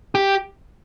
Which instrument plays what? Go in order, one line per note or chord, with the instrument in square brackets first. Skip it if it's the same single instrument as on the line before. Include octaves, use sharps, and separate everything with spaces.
[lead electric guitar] G4